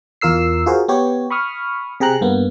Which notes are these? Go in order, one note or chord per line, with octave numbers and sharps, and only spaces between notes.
E2 F4 A#4 E6 C7
F4 F#4 G#4 A#4 C5
B3 G4 C#5
B5 C#6 D#6 F6
C3 G#4 G5 A#5 F#6
G2 A#3 B3